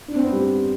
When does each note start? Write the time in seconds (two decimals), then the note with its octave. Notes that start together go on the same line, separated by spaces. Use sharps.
0.08 D4
0.16 C4
0.24 B3
0.32 G3